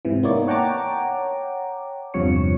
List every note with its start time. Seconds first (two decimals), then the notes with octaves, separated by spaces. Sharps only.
0.05 G#2 C3 E3
0.23 A#3 B3 D#4 E4 C#5 D5
0.48 C#5 F#5 G5 A5 A#5 D6
2.14 E2 G2 C3 F3 C#5 C#7